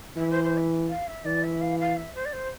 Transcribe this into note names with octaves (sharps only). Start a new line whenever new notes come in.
E3 E5
C5
C5
E5
F5
E5
E3 D5
E5
F5
F5
E5
C5
D5
C5